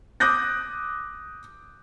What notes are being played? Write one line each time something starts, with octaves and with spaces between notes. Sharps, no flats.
D6 D#6 F#6 G6 A#6